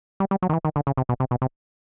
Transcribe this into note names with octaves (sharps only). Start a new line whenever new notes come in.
G3
G3
F#3
D#3
E3
D#3
D3
C#3
C3
B2
C3
B2
C3